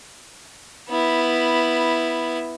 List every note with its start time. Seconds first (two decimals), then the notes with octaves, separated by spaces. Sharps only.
0.89 B3 E4